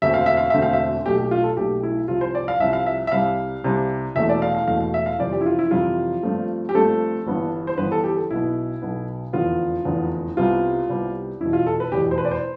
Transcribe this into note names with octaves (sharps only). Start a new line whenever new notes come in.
E1 D2 D3 A3 C4 E5
F5
E5
F5
E1 D2 D3 A3 C4 E5
F5
E5
B1 B2 A3 G4
G4
F4
A4
B1 B2 A3 G4
E4
C2 C3 F3 F4
C5
D5
F5
C2 C3 F3 E5
F5
E5
E5
C2 C3 G3 F5
C2 C3 G3
E1 E2 B2 A3 E5
D5
F5
F5
E1 E2 B2 A3 F5
F5
E5
F5
F2 C3 E3 G3 C4 D5
G4
E4
F4
E4
F2 C3 E3 G3 C4 F4
G2 F3 A3 C4
G4
G2 F3 A3 C4 A4
G1 G2 E3 B3
C5
G1 G2 E3 B3 B4
A4
G4
A4
B1 B2 B3 E4
B1 B2 B3
F1 E2 D3 F3 B3 F4
F1 E2 D3 F3 B3
C2 C3 G3 B3 F4
C2 C3 G3 B3
F1 E2 B2 E4
F4
A4
B4
F1 E2 B2 G4
C5
B4
D5
C5